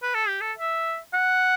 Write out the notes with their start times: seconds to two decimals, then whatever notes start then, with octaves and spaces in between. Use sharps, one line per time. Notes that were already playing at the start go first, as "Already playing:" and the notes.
0.03 B4
0.15 A4
0.28 G4
0.41 A4
0.59 E5
1.14 F#5